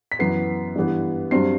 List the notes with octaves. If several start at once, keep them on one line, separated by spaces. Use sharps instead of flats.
B6
F#2 E3 B3 C7
G2 E3 B3
G2 F#3 C4 C7